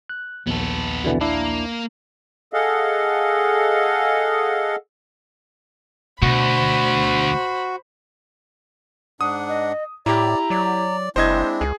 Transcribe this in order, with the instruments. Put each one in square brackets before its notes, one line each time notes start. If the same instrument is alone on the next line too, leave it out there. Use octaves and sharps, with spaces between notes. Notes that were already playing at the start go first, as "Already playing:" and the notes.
[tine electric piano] F#6
[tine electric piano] A#1 D#2 [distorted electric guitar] B3 A4
[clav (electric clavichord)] B2 D3 E3
[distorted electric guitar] A#3 [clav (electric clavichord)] D4 E4
[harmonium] G#4 A4 D#5 F5 F#5
[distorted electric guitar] D2 [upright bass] B2 [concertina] F#4 [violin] C5 B5
[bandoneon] G#2 D4 F#5 [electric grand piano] D#6
[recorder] D#5
[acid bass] A2 [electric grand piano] E4 G4 [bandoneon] D5 [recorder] A#5
[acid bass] F#3 [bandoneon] D5
[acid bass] F#1 [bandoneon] G#3 C4 D4 [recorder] E4 [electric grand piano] C5 D#5 G#6
[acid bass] C#2 [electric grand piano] G#4